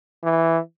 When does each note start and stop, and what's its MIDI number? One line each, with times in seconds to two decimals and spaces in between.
0.23 0.59 52